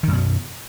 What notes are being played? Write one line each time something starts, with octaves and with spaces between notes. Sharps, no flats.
F#2 B2 D#3 F#3